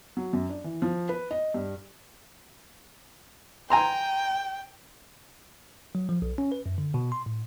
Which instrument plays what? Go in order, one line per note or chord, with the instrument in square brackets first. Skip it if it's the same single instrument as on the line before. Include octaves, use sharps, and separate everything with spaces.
[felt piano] F#3
F#2
D4
E3
F3
B4
D#5
G2
[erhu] G5 [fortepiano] G#5 A#5 C6
[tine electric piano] F#3
F3
B1
C#4
B4
F#2
D3
B2
C6
A2